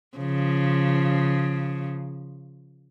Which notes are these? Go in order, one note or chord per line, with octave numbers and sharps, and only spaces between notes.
C#3 F3